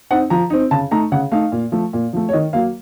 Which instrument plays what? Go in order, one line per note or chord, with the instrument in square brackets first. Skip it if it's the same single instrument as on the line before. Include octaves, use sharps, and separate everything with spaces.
[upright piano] C4 D#4 F#5
F3 A#5
C4 D#4
C#3 A5
A3 D#4 A#5
C#3 F#5
A3 D#4 F5
A#2
F3 A3
A#2
F3 A3
C#5
D#3 D#5
F#3 A#3 F5